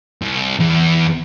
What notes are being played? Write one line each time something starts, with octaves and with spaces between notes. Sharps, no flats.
C2
E2